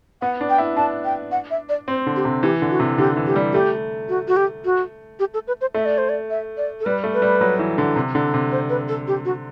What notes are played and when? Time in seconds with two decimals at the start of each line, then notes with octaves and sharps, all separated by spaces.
0.22 B3 F#5
0.41 D4
0.50 G5
0.58 E4
0.76 D4 A5
1.05 G5
1.32 F#5
1.51 E5
1.69 D5
1.88 C4 C5
2.07 D3
2.16 G4
2.25 C3
2.43 E3 G4
2.62 D3
2.71 F#4
2.80 C3
2.98 D3 G4
3.17 E3
3.27 G4
3.36 G3
3.53 A3 G4
4.09 F#4
4.28 F#4
4.37 G4
4.65 F#4
5.20 G4
5.34 A4
5.47 B4
5.61 C5
5.75 A3 E5
5.86 D5
5.98 C5
6.09 D5
6.30 E5
6.57 D5
6.80 A4
6.86 G3 B4
7.04 A3
7.14 B4
7.22 G3
7.41 F#3
7.59 E3
7.78 D3
7.96 C3
8.15 D3
8.34 C3
8.52 C5
8.70 B4
8.88 A4
9.08 G4
9.25 F#4